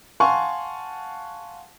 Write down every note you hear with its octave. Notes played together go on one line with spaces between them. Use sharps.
F5 F#5 G#5 A5 C6 C#6